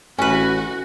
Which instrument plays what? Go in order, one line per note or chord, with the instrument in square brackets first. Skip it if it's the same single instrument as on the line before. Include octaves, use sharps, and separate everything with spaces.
[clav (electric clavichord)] A1 [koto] C#4 B4 [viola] F#4 [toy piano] G#5